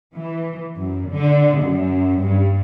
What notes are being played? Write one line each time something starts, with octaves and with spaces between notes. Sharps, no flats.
E3
F#2
D3
F#2
G2